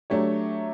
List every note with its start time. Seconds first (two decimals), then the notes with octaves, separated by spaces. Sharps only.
0.10 F#3 A3 D4 G4 C#5